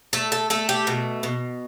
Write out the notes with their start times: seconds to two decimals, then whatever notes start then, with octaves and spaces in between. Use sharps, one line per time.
0.13 A3 A4
0.32 A4
0.50 A3 A4
0.69 G4
0.87 B2
1.23 B2